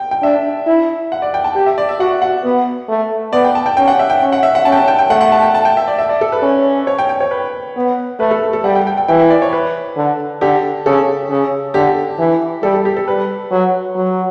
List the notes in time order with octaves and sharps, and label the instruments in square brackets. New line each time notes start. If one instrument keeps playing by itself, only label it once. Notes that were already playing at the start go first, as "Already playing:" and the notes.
Already playing: [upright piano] G5
G5
[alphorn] D4 [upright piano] E5
[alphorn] E4
[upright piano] F#5
D5
G5
A5
[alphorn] G4 [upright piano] G5
[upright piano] E5
D5
E5
[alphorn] F#4 [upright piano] F#5
[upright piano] F#5
[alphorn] B3
A3
[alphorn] B3 [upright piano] D5
[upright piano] G5
A5
G5
[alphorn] C#4 [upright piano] G5
[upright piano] F#5
E5
G5
[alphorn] C#4
[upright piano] F#5
E5
F#5
[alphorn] C#4 [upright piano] A5
[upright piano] G5
A5
G5
G5
[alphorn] A3 [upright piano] F#5
[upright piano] F#5
A5
G5
A5
G5
E5
D5
E5
D5
A4
B4
[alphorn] C#4
[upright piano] C#5
G5
G5
C#5
B4
[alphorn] B3
[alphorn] A3 [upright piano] B4
[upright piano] A4
A4
A4
[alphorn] G3 [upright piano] F#5
[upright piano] G5
G5
G5
[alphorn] E3 [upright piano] G5
[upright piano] E5
D5
C#5
B4
[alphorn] D3
[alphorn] D3 [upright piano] G4
[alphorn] C#3 [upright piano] A4
[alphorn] C#3
[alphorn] D3 [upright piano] G4
[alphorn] E3
[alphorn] G3 [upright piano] A4
[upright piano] A4
G4
A4
[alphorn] G3 [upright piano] B4
[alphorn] F#3
F#3